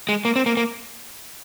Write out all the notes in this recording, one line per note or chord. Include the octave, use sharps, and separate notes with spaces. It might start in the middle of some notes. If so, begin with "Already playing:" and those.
G#3
A#3
C4
A#3
A#3